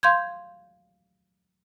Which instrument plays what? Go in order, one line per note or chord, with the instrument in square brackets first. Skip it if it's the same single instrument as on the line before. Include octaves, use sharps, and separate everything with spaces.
[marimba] F5 C6 G6 G#6